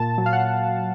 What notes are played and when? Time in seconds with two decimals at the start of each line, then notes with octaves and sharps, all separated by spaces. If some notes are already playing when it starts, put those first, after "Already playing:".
Already playing: A#2 A5
0.18 F#3
0.26 F5
0.33 F#5